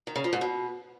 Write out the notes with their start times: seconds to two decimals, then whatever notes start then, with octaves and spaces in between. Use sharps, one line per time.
0.07 D#3
0.16 C#3
0.24 F3
0.33 G#2
0.41 B2